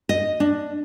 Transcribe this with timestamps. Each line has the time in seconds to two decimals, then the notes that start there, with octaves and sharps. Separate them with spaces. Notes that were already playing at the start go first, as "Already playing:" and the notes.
0.09 D#5
0.40 D4